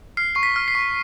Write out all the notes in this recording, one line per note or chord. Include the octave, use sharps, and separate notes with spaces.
F6 C7
C#6 C7
B6
F6
C7
C#6